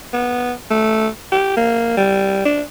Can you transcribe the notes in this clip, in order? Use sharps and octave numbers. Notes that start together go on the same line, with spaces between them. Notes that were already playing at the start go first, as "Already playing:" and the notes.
B3
A3
G4
A#3
G3
D4